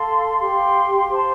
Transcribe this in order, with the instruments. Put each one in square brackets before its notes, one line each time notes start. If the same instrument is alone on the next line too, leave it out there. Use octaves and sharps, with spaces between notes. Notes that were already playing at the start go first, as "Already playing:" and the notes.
Already playing: [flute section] A4 F5 A5 C6
G4 F5 C6
C5 A5 C6